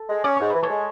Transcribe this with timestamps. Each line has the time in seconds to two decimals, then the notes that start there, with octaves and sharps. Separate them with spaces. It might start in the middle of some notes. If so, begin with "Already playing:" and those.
Already playing: A4
0.09 G#3
0.24 C#4 D5
0.37 G#2 C#5
0.50 E3 B4
0.63 A4 C#5
0.69 G#3